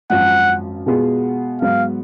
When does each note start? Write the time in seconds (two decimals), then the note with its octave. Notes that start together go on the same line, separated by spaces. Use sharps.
0.10 G#1 F#2 F3 F#5
0.86 B2 G#3 B3 F4 G#4
1.62 G#2 F#3 B3 F5